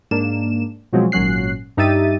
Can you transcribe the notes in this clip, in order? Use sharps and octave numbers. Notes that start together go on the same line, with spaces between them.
G#2 A#3 D4 E7
B2 F3 F#3 G#3 C4 C#4
G#1 A#2 F#3 C#4 F#6 C7
G2 D#4 G4 E5 A6 D#7